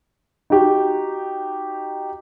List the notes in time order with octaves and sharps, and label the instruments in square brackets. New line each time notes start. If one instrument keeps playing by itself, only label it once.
[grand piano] D#4 F#4 G4